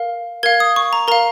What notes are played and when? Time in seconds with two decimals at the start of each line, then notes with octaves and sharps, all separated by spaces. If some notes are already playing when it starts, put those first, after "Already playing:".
Already playing: A#4 F5
0.43 A#4 F5 G#6
0.60 D#6
0.76 C#6
0.93 A#5
1.08 A#4 A#5
1.12 F5